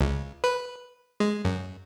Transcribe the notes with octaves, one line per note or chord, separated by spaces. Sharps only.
C#2
B4
G#3
F#2